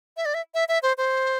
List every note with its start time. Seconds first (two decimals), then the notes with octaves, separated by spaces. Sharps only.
0.17 E5
0.25 D5
0.34 E5
0.54 E5
0.69 E5
0.83 C5
0.98 C5